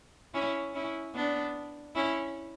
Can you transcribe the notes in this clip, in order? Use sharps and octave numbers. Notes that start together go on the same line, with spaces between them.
C#4 E4
C#4 E4
B3 D4
C#4 E4